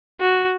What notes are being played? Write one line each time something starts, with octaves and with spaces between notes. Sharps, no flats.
F#4